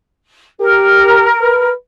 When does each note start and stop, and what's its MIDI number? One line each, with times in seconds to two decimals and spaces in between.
0.60 1.29 67
0.60 1.68 70
1.41 1.73 71